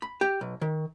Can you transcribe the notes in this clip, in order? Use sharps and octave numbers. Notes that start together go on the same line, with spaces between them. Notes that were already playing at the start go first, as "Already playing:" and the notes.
B5
G4
B1
D#3